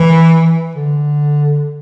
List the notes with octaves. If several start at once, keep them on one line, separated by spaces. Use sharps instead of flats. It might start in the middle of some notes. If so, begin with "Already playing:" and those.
Already playing: E3
D3